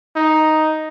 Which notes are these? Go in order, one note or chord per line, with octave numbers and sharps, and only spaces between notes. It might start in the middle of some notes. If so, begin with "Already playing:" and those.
D#4